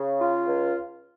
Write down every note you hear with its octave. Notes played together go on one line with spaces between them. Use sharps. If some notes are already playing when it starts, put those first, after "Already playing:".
Already playing: C#3
F4
C#2